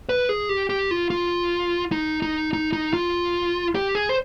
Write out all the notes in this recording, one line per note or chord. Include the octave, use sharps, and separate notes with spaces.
B4
G#4
G4
G4
F4
F4
D#4
D#4
D#4
D#4
F4
G4
G#4
C5